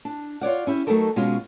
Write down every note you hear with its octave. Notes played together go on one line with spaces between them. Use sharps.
D4
F4 C#5 D5 F#5
C#4 E4 G4
F#3 A3 D#4 F#4 A4 A#4
B2 G#3 C#4 F4 F#4